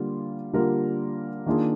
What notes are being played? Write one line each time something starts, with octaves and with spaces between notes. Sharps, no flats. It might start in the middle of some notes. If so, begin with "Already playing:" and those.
Already playing: D3 G3 A#3 F4 A#4
D3 G3 A#3 F4 A#4
D#3 A#3 D4 F4 G#4